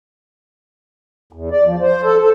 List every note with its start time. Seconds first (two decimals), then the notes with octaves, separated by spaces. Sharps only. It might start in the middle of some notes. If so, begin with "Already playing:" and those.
1.33 E2
1.51 D5
1.64 F3
1.81 C5
2.04 A4
2.20 A4